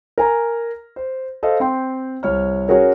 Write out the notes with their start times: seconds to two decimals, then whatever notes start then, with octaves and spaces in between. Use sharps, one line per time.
0.18 A#4 G#5 A#5
0.96 C5
1.43 A4 C5 D#5 F5
1.60 C4 G5 C6
2.23 C2 C#5 F6
2.68 C#4 F#4 G#4 A#4 C#5